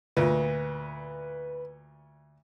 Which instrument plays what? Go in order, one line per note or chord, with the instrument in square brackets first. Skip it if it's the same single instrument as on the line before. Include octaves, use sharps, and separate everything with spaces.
[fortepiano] D2 A#2 [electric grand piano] B4